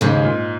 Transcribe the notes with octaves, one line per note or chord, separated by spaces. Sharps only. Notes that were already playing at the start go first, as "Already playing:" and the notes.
D#2 G#2 C#3 G#3
A#2